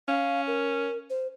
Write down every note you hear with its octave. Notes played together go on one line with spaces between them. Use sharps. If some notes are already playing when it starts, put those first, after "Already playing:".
C#4 F5
A#4
C5